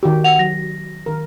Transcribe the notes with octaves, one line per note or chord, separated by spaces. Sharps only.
D#3 F#4 G4
F#5 F7
F#3 A#6
D#3 A#4